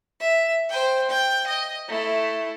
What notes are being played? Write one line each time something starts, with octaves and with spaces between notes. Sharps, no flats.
E5
C5 G5
G5
D#5
A3 E4